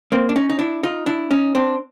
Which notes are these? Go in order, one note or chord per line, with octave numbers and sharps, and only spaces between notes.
A#3 C4
D4
C#4 D#4
D#4
D4 E4
D#4 F4
D4 E4
C#4 D#4
C4 D4